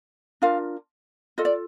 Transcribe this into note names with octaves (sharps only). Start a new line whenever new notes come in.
D4 F4 A#4 F5
F4 A4 D#5
D5